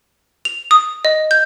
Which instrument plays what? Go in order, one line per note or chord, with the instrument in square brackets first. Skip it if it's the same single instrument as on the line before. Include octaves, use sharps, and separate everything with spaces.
[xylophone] F7
D#6
D#5
G6